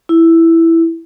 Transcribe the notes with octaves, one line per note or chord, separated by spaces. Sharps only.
E4